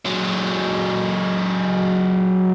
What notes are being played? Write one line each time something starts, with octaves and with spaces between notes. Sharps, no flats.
F#3 G#3